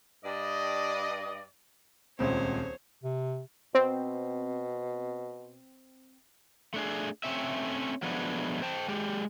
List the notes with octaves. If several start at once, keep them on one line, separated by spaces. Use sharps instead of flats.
G2 D5 D#5
D#1 C#2 C4 C5 C#5
C3
B2 C4
A3 D4 G#4
A3 C4 C#4 E5
F3 F#3 G#3 A3 B3 D4
C5 G5 A5
G#3 G4